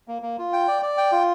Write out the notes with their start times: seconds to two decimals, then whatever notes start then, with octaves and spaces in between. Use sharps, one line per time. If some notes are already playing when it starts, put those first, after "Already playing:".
0.08 A#3
0.22 A#3
0.38 F4
0.53 G5
0.68 D5
0.82 D5
0.97 G5
1.12 F4